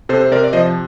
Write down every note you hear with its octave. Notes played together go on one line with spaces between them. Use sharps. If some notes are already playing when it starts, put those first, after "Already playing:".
C3 A4 C5
C5
C3 A#4 D5
D5
F3 C5 D#5